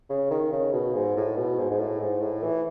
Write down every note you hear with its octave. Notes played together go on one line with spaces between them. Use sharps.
C#3
D#3
C#3
B2
G#2
A2
B2
G#2
G#2
A2
G#2
A2
E3